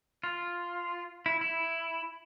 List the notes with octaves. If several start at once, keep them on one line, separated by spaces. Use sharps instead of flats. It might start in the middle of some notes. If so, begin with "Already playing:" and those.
F4
E4
E4